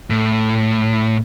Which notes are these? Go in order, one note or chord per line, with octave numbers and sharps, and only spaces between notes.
A2